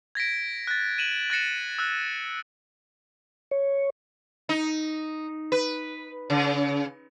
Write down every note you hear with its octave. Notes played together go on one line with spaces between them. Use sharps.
G#6 A#6 B6 D7
F#6 A6
D#7 E7 F#7
F#6 A6 A#6 C#7 E7
E6 F#6
C#5
D#4
B4
C#3